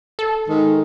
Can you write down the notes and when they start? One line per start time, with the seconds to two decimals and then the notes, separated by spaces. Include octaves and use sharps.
0.19 A4
0.48 G#2 D#3